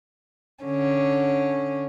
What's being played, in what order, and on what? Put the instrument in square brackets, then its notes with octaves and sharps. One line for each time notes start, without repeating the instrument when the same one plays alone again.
[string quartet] D3 C#4